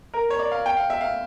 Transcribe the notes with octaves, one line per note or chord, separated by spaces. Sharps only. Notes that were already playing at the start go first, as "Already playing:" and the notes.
A#4
C#5
D5
F5
G5
F5
E5
F5